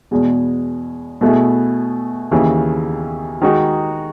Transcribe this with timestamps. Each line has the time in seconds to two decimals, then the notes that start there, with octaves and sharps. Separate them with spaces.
0.11 E2 B2 G#3
1.21 B2 A3 E4 G#4
2.31 D#2 C#3 E3
3.41 D#3 G#3 D#4 F#4